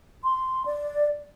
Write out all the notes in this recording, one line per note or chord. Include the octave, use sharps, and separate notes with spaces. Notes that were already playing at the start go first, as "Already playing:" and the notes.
C6
D5